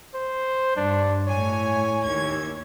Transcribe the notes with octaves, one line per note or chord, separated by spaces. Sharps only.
C5
G2 D4
A2 C#5 G#5
D#2 G#6